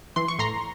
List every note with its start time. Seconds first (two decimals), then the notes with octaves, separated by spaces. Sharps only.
0.16 E3 C6
0.28 C#6
0.39 A2 A#5 C6